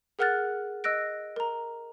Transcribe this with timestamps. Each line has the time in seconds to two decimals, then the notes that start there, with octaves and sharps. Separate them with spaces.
0.19 G#4 A#4 F#5 F6 F#6 A6
0.84 D#5 E6 F#6 A#6 D7
1.36 A#4 A#5